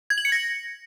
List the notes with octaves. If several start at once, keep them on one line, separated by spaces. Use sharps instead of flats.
G#6
F#7
C#7
A#6